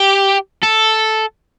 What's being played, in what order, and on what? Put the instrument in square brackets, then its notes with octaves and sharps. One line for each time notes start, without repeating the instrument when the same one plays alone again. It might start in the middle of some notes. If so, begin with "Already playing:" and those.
Already playing: [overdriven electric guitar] G4
A4